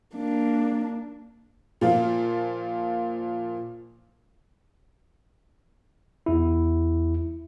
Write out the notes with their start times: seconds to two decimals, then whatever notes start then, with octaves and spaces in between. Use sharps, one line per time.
0.15 A#3 D4
1.81 A#2 F3 F4
6.26 E2 E4